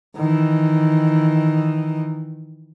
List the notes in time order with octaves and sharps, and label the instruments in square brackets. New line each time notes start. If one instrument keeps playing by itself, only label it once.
[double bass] D#3 E3